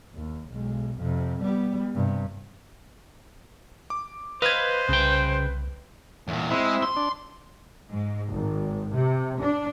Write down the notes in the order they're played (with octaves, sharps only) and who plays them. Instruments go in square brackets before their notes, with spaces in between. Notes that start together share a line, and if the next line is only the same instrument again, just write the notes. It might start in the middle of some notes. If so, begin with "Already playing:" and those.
[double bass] D#2
B1 G#3
F2 C3
G3 B3
G2 C3
[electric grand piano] D6
[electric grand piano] B4 G#6 [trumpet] C5 [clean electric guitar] D#5 F5
[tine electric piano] C2 [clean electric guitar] C#3 G5
[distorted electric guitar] E2 A#2
[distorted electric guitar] G#3 [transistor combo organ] C4 E4 E5
[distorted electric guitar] C6
[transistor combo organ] D4
[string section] G#2
G#1
C3
D4